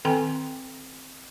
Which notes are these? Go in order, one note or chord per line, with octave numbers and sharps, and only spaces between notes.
D#3 C4 A4 G5 G#5 C6